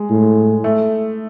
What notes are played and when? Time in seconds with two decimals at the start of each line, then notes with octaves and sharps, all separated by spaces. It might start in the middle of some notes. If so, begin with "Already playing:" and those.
Already playing: G#3
0.10 A2
0.64 A3